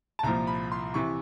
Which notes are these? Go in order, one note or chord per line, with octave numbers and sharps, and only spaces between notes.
A5
C2 A#2 F3 A#5
B5
C6
C3 E3 C#6